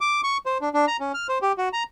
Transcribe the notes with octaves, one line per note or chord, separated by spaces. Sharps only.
D6
C#6
C5
D4
D4
A#5
C#4
F6
C5
G4
F#4
A#5